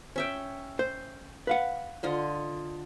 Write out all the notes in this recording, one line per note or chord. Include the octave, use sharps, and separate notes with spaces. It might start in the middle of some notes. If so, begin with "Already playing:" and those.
C#4 E5 G5
C5
B4 F5 F#5
D3 F4 D#5